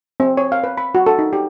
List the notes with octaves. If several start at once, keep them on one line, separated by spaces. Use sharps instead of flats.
C4
C#5
F5
B4
B5
F#4
A4
D#4
G4